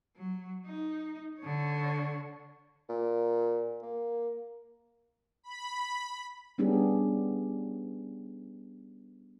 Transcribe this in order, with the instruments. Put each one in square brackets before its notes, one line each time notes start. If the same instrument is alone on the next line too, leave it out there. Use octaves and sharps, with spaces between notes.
[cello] F#3
D#4
D3 C#5
[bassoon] A#2
A#3
[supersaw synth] B5
[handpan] G3 B3 C#4 D4 G4 G#4